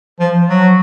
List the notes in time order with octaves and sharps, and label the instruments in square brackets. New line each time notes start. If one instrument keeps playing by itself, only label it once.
[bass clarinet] F3
F#3